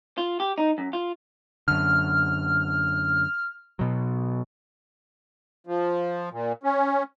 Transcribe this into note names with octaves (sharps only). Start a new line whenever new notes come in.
F4
G4
D#4
F#2
F4
F#2 D3 F6
B2 F#3
F3
A#2
C#4